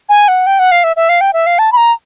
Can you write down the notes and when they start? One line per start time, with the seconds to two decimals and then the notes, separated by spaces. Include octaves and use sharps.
0.09 G#5
0.28 F#5
0.46 G5
0.59 F#5
0.71 F5
0.84 E5
0.96 E5
1.09 F5
1.21 G5
1.33 E5
1.46 F5
1.59 A5
1.72 B5
1.77 A#5